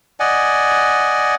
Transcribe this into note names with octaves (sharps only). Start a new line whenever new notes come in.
D5 D#5 F#5 G#5